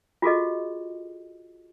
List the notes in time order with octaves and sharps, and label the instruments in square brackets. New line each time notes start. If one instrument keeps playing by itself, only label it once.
[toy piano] F4 F#4 G#4 A4 D#5